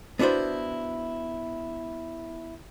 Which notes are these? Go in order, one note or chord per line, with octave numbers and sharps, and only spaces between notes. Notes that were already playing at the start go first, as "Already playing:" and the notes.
B3 D4 E4 F#4 C5